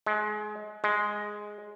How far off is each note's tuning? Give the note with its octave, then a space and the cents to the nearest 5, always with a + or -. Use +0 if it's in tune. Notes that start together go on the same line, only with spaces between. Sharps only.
G#3 +25
G#3 +0